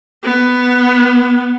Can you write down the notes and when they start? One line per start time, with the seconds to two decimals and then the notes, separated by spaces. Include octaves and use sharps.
0.24 B3